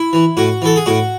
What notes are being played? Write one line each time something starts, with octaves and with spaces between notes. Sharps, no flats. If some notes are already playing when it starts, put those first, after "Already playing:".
Already playing: E4
E3
A2 F#4
E3 A4
G#4
A2 F#4